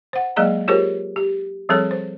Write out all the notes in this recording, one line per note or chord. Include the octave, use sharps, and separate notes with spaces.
C5 F#5
F#3 G#3 A#3 G#4 D5 A#5
F4 G4 G#4 A#4 C5 C#5
G4
F3 G3 C4 G#4 A4 C#5
C5